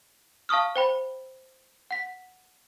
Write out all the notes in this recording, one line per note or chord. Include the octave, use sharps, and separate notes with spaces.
F5 A5 C#6 D#6 F6
C5 G5 B5
F#5 B6